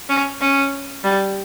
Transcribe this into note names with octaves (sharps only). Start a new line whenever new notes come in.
C#4
C#4
G3